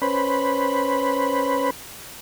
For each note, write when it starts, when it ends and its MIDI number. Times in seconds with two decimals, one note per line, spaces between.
0.02 1.71 61
0.02 1.71 71
0.02 1.71 72
0.02 1.71 83